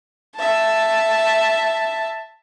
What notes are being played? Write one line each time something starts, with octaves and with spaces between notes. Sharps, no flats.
E5 A5